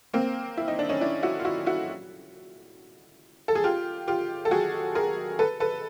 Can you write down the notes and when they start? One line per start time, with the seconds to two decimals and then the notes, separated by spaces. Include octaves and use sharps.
0.13 A#3 C4
0.57 E4
0.68 D#4
0.79 D4
0.89 C#4 D#4
1.01 D4 E4
1.23 E4 F#4
1.39 F4
1.45 E4 F#4
1.66 E4 F#4
3.48 A4
3.55 G#4
3.64 F4 G4
4.08 F4 G4
4.45 A4
4.51 F#4 G#4
4.95 G#4 A#4
5.39 A4 B4
5.60 A4 B4